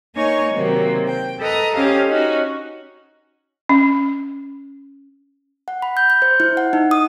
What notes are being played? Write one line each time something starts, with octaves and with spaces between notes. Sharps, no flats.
A#3 D#4 C#5 G#5 C#6
C3 D#3 F#3 A#3 C4
G5
A4 B4 D#5 A#5 D#6
C#4 G4 A4 C5 D#5 F5
C#4 D#4 F#4
C#4
F#5
B5
G6
G6
C5
E4
F#5
D#4
D#6